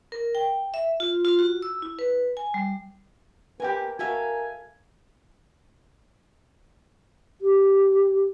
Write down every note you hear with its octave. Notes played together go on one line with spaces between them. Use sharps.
A#4
G5
E5
F4
F4
F#4
E6
E4
B4
G#5
G3
A#3 G4 A#4 B4 G5 G#5
F#4 A4 A#4 E5 F5 G#5
G4